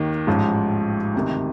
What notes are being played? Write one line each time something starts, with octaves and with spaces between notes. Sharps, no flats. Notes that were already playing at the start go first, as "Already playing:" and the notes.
Already playing: D#2 D#3
A1 G#2 F3
D2 C3 D#3